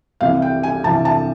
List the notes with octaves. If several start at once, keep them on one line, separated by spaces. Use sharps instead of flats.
C2 C3 E3 F5
G5
G#5
C2 C3 E3 A5
A5